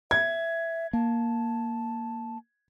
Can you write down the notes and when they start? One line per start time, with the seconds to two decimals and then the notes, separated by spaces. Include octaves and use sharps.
0.11 E5 G#6
0.93 A#3 A5